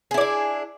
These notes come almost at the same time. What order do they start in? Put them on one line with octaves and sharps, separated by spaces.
G#4 E4 D5 D4